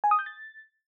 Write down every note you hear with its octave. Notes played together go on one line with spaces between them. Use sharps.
G#5
D#6
G6
A6